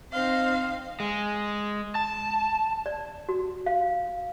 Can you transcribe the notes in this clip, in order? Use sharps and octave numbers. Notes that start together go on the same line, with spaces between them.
C4 D#4 C5 F5
G#3
A5
D5
F#4
F5